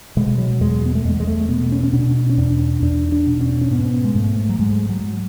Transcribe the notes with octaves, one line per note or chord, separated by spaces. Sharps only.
B2 G#3
F#3
E2 G#3
B3
A3
E2 G#3
G#3
A3
B2 B3
C#4
C#4
B2 D4
C#4
E2 D4
E2 D4
D4
B2
C#4
C#4
G#2 B3
G#3
G#2 A3
F#3
G#2 G#3
F#3